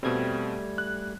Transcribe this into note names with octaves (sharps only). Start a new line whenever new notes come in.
B2 G3 A3 C4 G#6
F#6